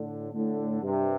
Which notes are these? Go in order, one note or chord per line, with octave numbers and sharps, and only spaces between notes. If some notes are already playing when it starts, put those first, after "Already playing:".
Already playing: A2 D3
A2 D3
G2 C3